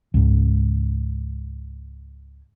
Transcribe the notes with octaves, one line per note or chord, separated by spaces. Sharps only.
C#2 G#2